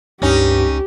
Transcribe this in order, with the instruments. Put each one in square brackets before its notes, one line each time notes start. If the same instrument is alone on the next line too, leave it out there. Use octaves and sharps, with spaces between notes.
[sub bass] C#2 [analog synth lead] G2 [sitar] C#4 D#4 [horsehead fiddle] G4